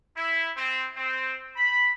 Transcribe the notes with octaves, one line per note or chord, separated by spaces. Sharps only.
E4
C4
C4
B5